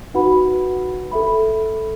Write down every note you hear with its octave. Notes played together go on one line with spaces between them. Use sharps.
D#4 F#4 B4 F#5 B5
A4 E5 B5